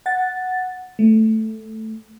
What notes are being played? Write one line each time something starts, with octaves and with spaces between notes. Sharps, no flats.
F#5 A6
A3